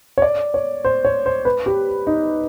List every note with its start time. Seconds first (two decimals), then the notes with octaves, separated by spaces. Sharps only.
0.18 C#5
0.22 D5
0.54 C#5
0.84 C5
1.05 C#5
1.26 C5
1.45 B4
1.66 G4
2.07 D#4